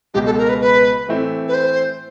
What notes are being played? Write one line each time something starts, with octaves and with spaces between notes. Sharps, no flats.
C#2 B2 G#3 G4
A4
A#4
B4
B4
A2 E3 A3 C4 E4
B4
C5